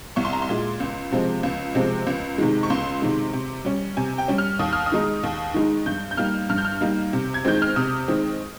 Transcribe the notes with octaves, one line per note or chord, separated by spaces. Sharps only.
C2 C#6
C6
A#5
C6
A#2 G#3
C#2
C3 F3 G#3 C4
C#2
C3 F3 G#3 C4
C#2
C3 D#3 G#3
C#6
C#2 C6
C3 D#3 G#3
C3
G3 C#4
C3 G#5
G5
G3 C#4
F6
D#2 D#6
F6
D#6
D#3 G#3 D#4
D#2
D#3 G#3 D#4
G2 G6
G6
G3 A#3 D#4 F6
G2 F6
G6
F6
G3 A#3 D#4
C3
G#6
D#3 G#3 C4 G6
F6
C3 D#6
D#3 G#3 C4